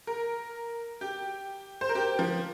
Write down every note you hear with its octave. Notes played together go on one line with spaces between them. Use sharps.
A#4
G4
C5
A#4
G4
F3